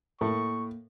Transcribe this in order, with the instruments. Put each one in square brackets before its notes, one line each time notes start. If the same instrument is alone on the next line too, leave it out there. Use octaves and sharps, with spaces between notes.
[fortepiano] A2 [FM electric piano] A#3 [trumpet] C#6